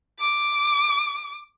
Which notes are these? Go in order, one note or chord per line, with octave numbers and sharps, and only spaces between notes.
D6